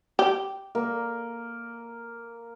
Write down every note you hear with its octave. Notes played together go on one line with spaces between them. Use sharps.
G4
A#3